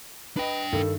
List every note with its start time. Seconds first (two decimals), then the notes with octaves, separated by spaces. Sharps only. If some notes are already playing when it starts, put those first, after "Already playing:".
0.37 D4 B4 D#5 G5
0.72 G2 D#3 A4